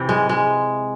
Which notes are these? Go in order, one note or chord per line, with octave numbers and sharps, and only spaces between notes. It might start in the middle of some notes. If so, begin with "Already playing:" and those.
Already playing: C3 E3
G#3
G#3